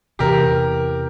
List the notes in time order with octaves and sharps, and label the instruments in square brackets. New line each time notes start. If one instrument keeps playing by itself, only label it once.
[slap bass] E2 C3 E3 [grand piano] G4 A#4